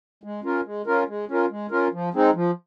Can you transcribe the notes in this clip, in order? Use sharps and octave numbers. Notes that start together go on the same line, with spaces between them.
G#3
C#4 F4 A#4
G#3
C#4 F4 A#4
G#3
C#4 F4 A#4
G#3
C#4 F4 A#4
F3
G#3 C4 D#4
F3